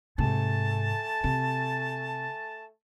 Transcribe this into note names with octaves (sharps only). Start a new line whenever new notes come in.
G#2 C3 A3 G#5 A5
C3